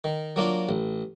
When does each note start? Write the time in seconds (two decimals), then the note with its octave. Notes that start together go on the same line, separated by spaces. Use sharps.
0.04 D#3
0.36 F#3 A#3 D4 F4
0.69 A1